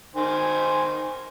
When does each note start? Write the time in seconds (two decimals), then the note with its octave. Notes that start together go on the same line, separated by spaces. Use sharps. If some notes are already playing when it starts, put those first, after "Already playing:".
0.16 D#3 C5 G#5